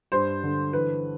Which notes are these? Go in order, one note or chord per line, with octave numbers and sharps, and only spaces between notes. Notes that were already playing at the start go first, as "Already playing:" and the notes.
G2 C5
D3
E3 B4